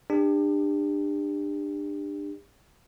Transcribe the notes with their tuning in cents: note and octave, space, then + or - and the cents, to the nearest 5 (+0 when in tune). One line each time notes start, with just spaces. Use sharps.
D4 +25 G4 +35